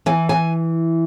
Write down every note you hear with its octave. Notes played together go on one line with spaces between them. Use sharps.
E3 G#5
G#5